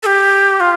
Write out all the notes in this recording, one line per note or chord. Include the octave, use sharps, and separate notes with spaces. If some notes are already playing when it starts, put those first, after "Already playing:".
A4
G4
F4